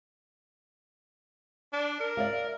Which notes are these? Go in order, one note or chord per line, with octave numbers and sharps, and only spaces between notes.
D4
A#4
D5 E5 F5